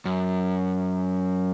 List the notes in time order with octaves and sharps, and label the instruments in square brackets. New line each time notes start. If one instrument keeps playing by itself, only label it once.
[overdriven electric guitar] F#2